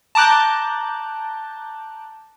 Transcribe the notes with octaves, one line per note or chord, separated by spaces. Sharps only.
A5 A#5 D6 F#6 G6